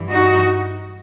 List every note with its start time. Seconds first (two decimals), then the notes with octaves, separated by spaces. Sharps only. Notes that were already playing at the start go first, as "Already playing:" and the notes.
Already playing: G2 E3
0.10 D#4 F#4